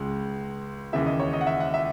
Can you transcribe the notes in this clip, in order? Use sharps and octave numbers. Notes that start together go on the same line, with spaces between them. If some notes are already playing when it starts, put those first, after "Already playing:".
Already playing: C#2 C#3 G#3
D#2 C#3 E3 E5
D#5
C#5
D#5
F#5
E5
F#5
E5